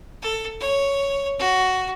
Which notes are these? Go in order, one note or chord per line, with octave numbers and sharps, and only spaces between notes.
A4
C#5
F#4